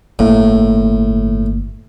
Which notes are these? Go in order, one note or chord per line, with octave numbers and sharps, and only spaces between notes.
G1 A2 A#3